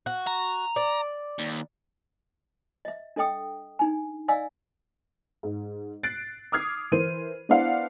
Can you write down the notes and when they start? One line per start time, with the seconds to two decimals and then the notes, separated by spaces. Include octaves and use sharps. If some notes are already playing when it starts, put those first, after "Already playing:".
0.06 F#4
0.27 A#5
0.76 D5
1.39 D#2
2.85 D#5 E5
3.16 D4 A4 D#5 G5 D#6
3.79 D4 D#4 G#5
4.28 D5 D#5 F5 G#5 E6
5.43 G#2
6.03 F#6 A6 C7 D7
6.52 D6 D#6 F6 G#6 C7
6.92 E3 A#4 C5 D#7
7.49 B3 D4 E4 C5 F5 F#5